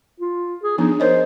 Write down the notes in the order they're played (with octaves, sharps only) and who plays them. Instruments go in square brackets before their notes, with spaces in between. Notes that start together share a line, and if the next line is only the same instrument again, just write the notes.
[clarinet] F4
G#4
[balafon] F3 B3 D4 [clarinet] D#4
[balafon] A#4 C#5 D#5 [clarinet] C5